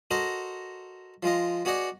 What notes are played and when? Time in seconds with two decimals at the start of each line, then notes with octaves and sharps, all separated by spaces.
0.11 F#4 A4 A#4 C5 D#5 A#5
1.23 F3 G#3 F4 D#5
1.65 B3 F#4 G#4 D5 D#5 F#5